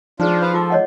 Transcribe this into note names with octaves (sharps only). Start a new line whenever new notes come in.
F3 D4 D#4 F4 G#4
B4 C5 F5
F4 A4 D6
C#5 D#5 F#5